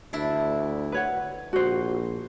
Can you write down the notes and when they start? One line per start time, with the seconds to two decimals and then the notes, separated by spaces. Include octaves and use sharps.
0.13 D2 D4 E4
0.92 B4 C#5 F#5
1.53 A#1 F#4 C5